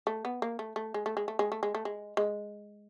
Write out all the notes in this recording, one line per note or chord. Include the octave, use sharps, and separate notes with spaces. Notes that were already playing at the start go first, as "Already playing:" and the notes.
A3
B3
A#3
A3
A3
G#3
A3
G#3
A3
G#3
A3
G#3
A3
G#3
G#3